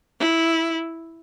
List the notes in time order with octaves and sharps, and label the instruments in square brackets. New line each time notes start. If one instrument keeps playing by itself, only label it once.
[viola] E4